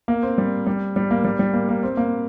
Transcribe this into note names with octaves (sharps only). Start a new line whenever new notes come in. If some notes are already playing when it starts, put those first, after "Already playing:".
A#3
C4
G3
G3
G3
A#3
G3
G3
A#3
A#3
C4
A#3